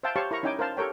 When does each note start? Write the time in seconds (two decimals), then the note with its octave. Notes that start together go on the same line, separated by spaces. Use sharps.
0.03 C5 E5 F5 G5 A5
0.16 G4 C5 C#5 F5 A5 C#6
0.31 E4 A#4 A#5 C#6
0.43 C#4 D#4 E4 G5 G#5 D6
0.59 A#4 C5 F5 A5
0.77 G4 A4 A#4 C#5 G5